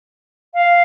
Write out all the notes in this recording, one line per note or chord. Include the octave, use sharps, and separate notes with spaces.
F5